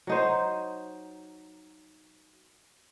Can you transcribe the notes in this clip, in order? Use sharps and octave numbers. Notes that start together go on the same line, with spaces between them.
F#3 D#4 C5